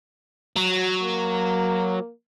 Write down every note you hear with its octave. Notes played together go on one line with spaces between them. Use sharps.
F#3
A#3